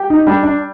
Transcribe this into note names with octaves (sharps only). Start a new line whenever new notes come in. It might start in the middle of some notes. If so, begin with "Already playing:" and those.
Already playing: G4
D#4
G3 D4
D4